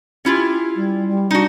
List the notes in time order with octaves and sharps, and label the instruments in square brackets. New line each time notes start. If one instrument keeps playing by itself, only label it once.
[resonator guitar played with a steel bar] C#4 E4 F4 [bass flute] G4
[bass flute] G3
G3
[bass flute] D4 [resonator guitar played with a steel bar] D#4 F#4